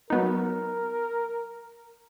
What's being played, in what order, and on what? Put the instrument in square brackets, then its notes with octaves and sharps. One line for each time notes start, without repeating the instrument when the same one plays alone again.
[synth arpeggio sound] F#3 B3 D#4 [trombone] A#4